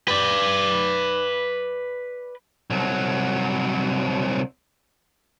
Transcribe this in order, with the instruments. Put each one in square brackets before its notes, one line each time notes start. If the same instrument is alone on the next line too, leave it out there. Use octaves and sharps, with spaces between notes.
[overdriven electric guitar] B4 D5
[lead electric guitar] C2 F#3